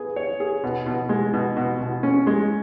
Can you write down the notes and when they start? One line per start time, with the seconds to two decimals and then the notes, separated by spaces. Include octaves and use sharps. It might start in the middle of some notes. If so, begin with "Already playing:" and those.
Already playing: B3 G#4
0.16 C#5
0.40 G#4
0.63 B2
0.86 B2
1.09 G#3
1.33 B2
1.57 B2
1.81 B2
2.03 C#4
2.27 G#3